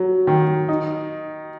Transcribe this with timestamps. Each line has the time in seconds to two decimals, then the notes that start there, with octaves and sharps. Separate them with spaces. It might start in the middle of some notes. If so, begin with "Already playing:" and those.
Already playing: F#3
0.27 D#3
0.69 D#4